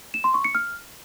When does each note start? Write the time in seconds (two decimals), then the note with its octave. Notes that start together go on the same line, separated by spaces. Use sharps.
0.14 E7
0.24 C6
0.34 C#6
0.44 C#7
0.55 F6